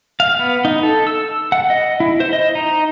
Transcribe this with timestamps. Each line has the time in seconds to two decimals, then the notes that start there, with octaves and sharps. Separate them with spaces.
0.20 F5
0.39 B3
0.65 D#4
0.83 A4
1.07 E6
1.52 F#5
1.70 D#5
2.00 E4
2.20 C5
2.33 D#5
2.55 D#4